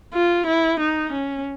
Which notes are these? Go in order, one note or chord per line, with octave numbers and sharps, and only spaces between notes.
F4
E4
D#4
C#4